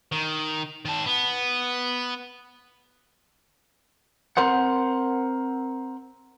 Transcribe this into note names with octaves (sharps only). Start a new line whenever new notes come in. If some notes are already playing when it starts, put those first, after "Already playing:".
D#3
D#3 A5
B3
C4 A#4 C5 F#5